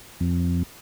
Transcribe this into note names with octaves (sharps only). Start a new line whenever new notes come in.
F2